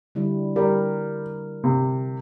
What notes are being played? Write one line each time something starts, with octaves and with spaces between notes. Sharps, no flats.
D3 G3 E4
G3 A#4
C3